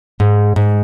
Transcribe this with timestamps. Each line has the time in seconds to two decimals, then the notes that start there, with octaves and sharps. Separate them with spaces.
0.20 G#2
0.56 G#2